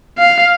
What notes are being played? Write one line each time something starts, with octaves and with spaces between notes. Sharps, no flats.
F5